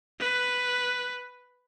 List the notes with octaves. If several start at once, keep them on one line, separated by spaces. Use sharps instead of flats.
B4